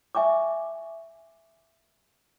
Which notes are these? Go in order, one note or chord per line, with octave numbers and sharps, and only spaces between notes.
E5 G#5 C#6 D6